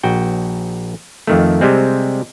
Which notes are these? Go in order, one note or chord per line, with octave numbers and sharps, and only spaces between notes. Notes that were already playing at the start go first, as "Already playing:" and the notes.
A#1 F#4 G5
F2 D#3 A3
C3 G3 G#3 C4